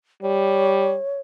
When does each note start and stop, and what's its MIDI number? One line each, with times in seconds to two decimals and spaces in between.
0.23 0.97 55
0.23 1.21 73